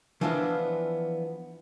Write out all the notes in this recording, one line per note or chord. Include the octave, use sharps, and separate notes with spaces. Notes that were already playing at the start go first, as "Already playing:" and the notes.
E3 F3 B3 D4 F4 E5